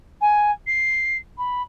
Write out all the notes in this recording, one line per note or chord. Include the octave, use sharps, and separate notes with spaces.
G#5
C7
B5